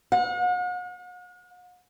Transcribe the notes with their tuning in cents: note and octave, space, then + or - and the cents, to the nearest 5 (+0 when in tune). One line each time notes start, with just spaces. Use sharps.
F#5 -45